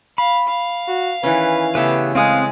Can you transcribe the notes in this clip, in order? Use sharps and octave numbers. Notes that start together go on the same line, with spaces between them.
F5 B5
F5
F#4
D#3 E3 C#4 B4
C#3 A3 B3 G4 B4 E5
G#3 C4 F5 D#6 F#6